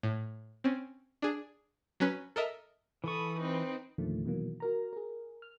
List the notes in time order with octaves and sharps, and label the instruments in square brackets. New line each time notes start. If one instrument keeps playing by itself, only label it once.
[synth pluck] A2
C4 C#4
D4 G#4
F#3 C#4 B4
A4 A#4 D#5 E5
[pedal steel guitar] E3 C#6 [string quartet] A4 B5 D#6
[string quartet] C4 D#4 B4
[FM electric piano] E2 A#2 D3 D#3 F3 A3
B2 D#3 E3 F#3 A#3
F#4 A#4 A#5
G#4 A#4
F6